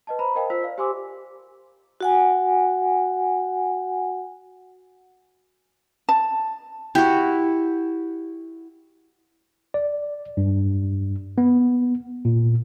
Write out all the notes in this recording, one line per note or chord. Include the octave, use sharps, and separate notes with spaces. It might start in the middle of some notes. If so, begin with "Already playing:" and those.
B4 D#5 A5
C5 A#5 B5
A#4 C5 D#5 F5 G5 A5
F4 C5 E6 B6
D5 F5
G4 C5 G#5 C6 D6 E6
F#4 F#5 G#5
A5
E4 F#4 G4
D5
G2
B3
A#2